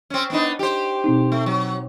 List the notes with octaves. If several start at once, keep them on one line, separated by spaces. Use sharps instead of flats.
C4 C#4
B3 D4 D#4
G4 C5
B2 C4 D#4
A3
F#3